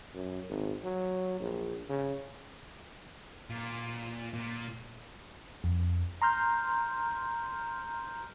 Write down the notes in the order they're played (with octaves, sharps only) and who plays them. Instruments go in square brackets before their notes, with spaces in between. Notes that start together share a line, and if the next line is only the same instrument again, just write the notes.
[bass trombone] F#2
G#1
F#3
A#1
C#3
[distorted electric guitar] A#2
A#2
[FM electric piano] F2
A#5 C6 F6 G6